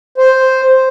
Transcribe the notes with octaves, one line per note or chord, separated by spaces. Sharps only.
C5